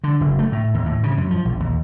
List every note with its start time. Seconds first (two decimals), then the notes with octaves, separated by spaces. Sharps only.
0.04 D3
0.21 F#1
0.39 A3
0.52 A2
0.74 D#2
0.86 A2
1.03 C#3
1.18 F#2
1.31 F3
1.45 A#1
1.60 D#2